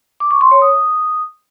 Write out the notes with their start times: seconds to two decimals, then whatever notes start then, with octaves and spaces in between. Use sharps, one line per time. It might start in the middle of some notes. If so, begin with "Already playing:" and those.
0.20 D6
0.31 C#6
0.41 C6
0.51 C#5
0.62 D#6